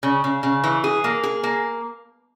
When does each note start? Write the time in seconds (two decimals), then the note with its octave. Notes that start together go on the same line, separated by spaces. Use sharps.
0.03 C#3
0.24 C#3
0.43 C#3
0.64 E3
0.84 G#4
1.04 A#3
1.23 G#4
1.44 A#3